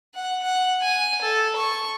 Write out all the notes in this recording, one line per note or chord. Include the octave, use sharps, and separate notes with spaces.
F#5
F#5
G#5
A4
C#6